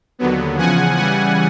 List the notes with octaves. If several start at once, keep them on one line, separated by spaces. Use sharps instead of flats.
D#2 D3 F#3 B3
E2 C#3 F3 F#5 G#5
C#3 E3 G3 F#5 G#5